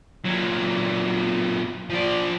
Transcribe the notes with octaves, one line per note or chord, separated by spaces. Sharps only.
A#2 F#3
F3 D5